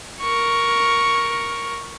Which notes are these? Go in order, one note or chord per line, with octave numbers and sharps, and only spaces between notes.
A#4 C#6